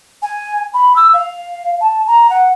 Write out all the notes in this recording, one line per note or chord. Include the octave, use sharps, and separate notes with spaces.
G#5
B5
E6
F5
A5
A#5
F#5